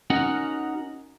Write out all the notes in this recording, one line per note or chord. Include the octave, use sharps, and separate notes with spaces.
C#4 D#4 F#4 A#4 F#5